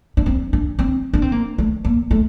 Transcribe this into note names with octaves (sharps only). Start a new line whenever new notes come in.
D4
C4
D4
C4
D4
C4
A#3
A3
A#3
A3